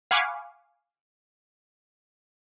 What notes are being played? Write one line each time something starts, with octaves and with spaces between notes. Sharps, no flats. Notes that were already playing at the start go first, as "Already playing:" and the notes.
F5 F#5 G#5 B5 C#6 D6